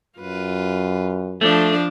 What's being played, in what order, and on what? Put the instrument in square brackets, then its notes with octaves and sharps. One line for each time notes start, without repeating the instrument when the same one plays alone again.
[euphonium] F#2 [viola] F4 B4
[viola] F3 D4 [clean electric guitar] A3